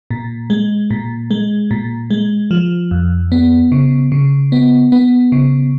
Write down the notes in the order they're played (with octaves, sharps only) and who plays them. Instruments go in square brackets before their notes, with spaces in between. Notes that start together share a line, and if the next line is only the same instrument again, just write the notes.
[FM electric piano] A#2
G#3
A#2
G#3
A#2
G#3
F3
F2
B3
C#3
C#3
B3
B3
C#3